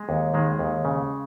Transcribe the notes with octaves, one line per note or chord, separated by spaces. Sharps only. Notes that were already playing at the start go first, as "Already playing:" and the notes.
Already playing: G#3
D#2
D#3 G#3
D#2
C#3